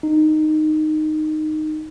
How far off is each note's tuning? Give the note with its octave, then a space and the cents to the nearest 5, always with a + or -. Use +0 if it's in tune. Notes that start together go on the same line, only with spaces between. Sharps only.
D#4 -10